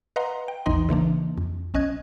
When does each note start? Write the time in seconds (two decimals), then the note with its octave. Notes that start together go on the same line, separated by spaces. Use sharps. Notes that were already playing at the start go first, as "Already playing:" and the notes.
0.16 B4 D#5 F5 F#5 A#5 C6
0.48 G5
0.66 A#1 E2 E3 D#4 D#5 C6
0.89 C#3 E3 A#3 D4
1.38 F2
1.74 B1 C#4 D#5 F#6 G#6